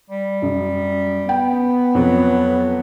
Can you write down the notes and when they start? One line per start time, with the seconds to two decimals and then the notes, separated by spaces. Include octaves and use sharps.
0.10 G3
0.42 F#2
1.29 B3 G5
1.95 F2 F#3